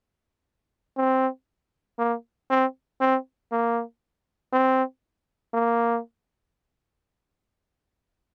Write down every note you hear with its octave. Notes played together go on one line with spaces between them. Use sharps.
C4
A#3
C4
C4
A#3
C4
A#3